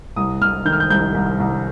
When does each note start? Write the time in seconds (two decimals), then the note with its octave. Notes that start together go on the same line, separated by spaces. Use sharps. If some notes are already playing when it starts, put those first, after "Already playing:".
0.16 C2 D#6
0.41 C2 F6
0.65 D#3 G6
0.73 F6
0.80 G6
0.90 C2 G6
1.14 C2
1.40 C2